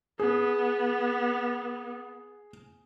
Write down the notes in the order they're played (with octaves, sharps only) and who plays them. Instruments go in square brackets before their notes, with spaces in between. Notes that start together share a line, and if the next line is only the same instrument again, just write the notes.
[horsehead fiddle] B3 [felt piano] G#4